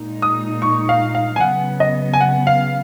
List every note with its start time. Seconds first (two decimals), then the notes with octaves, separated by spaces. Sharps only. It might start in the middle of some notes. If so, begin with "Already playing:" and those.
Already playing: A#2 G#3 D#4
0.22 D#6
0.62 C#6
0.89 F5
1.15 F5
1.36 G#5
1.40 C#3 F#3 B3 F#5
1.80 D#5
2.13 G#5
2.21 F#5
2.47 F5